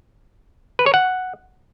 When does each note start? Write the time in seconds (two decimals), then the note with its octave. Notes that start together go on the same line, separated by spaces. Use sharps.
0.79 B4
0.86 C#5
0.94 F#5